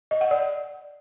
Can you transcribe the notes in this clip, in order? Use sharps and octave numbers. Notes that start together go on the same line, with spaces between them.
D#5
F#5
D5